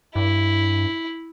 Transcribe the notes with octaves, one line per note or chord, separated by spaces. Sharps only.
G2 E4